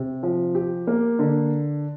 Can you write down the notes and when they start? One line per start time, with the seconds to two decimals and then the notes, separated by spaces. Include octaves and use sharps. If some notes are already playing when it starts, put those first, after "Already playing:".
Already playing: C3
0.23 F3
0.55 G4
0.87 A#3
1.19 D3